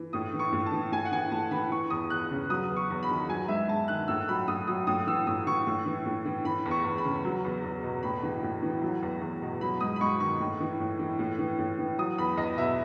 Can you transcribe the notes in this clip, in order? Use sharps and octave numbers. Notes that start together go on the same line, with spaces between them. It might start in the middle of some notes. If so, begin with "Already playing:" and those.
Already playing: E3
A2 D#6
E3
C#6
A2
A5
E3
A2 G#5
F#5
E3 G#5
A2 A5
E3 B5
E3 C#6
E2 D#6
E2 F#6
C#3
F#3 D#6
E2
C#6
E2
B5
D#3
F#3 G#5
G#2 E5
G#2 A5
D#3 F#6
A2 E6
F#3 B5
A2 D#6
F#3 D#6
A2 D#6
E3 E6
A2 D#6
E3 C#6
A2
E3
A2
E3
E3 B5
E2
C#6
E2
B5
C#3
F#3
E2
E2
B2
A2 B5
E3
A2
E3
F#3
E2
E2
B2
F#3 B5
G#2 D#6
B5
G#2 C#6
D#3 C#6
A2
E3
A2
E3
A2
E3
A2
E3
F#3 D#6
E2 B5
E2 D#5
B2 E5